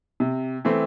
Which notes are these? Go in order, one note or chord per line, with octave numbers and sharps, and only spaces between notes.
C3
E3 A3 C4